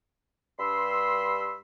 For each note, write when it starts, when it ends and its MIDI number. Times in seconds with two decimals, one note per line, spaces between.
0.59 1.59 43
0.59 1.59 83
0.59 1.59 84
0.59 1.59 88